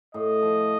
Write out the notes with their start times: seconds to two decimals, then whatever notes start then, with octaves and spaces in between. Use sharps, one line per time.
0.14 A2 D#5
0.42 F3